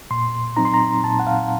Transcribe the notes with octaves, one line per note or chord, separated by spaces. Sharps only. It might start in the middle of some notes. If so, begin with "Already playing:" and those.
A#2 C6
F#3 C4 D#4 A#5
C6
A#5
A#2 A5
F#5
F5